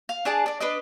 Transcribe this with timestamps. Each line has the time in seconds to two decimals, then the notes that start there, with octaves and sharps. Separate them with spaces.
0.09 F5
0.25 D4 G#4 D5 A5
0.46 D4 D5
0.60 D4 B4 D5 D#5